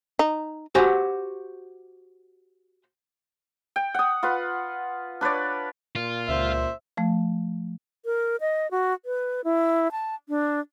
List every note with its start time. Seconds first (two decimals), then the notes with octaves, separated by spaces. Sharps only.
0.19 D#4
0.75 F#4 G4 C5 F#5 G#5
3.76 G5
3.94 F#5 D#6
4.23 F4 B4 F#5
5.21 D4 B4 C#5 D5
5.95 A#2 F4
6.29 C#2 C5 E5
6.97 F3 A3
8.05 A#4
8.41 D#5
8.71 F#4
9.05 B4
9.44 E4
9.92 A5
10.29 D4